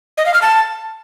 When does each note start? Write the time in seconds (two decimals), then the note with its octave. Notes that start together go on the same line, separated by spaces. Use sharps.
0.18 D#5
0.26 F5
0.34 F6
0.42 A5